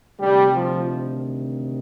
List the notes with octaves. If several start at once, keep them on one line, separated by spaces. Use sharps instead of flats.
D2 C3 D#3 G3
F3